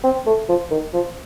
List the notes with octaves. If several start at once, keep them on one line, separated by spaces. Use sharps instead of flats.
C4
A3
F3
D#3
F3